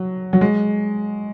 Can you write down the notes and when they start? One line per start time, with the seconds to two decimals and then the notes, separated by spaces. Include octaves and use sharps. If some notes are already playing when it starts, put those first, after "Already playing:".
Already playing: F#3
0.33 F#3
0.41 G#3